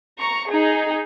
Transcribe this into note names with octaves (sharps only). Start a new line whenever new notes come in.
A#5 C#6
D#4 G#4